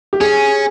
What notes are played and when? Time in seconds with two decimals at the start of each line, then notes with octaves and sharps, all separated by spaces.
0.13 G4
0.21 C#4 G#4